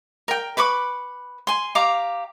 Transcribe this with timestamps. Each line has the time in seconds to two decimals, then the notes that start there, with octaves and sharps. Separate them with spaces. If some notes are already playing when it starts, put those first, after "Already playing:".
0.28 A#4 G5
0.57 B4 B5 C#6 D6
1.47 G#5 C6
1.75 G4 F5 A#5 D6